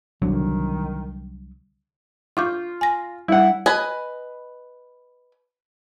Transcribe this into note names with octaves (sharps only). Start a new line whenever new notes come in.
C2 D3 D#3 F#3
F4 C#6 D6 G6
G#5 A#6
G3 E4 F#5
B4 D#5 G#5